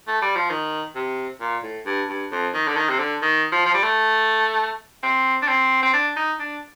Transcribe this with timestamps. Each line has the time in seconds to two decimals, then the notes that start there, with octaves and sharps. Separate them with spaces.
0.07 A3
0.22 G3
0.36 F3
0.50 D#3
0.95 C3
1.40 A#2
1.63 A2
1.86 G2
2.09 G2
2.31 F2
2.54 D#3
2.68 D3
2.77 D#3
2.89 C3
2.99 D3
3.22 D#3
3.52 F3
3.65 F3
3.74 G3
3.83 A3
5.03 C4
5.42 D4
5.48 C4
5.83 C4
5.93 D4
6.16 D#4
6.40 D4